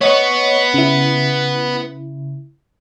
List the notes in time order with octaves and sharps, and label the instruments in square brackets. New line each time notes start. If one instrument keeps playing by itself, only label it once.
[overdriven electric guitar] B3 [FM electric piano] C#5 D#5 C#6
[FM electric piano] C#3 E4